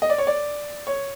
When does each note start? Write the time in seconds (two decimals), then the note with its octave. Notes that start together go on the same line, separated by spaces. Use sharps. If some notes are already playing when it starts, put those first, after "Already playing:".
0.02 D#5
0.10 D5
0.18 C#5
0.27 D5
0.87 C#5